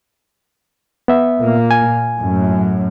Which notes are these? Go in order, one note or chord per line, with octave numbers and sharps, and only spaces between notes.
B3 E5
A#2 A#3
G#5
F#2 A2